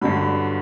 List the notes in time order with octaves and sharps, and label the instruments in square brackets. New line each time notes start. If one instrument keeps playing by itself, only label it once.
[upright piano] G2 D3 F#3 B5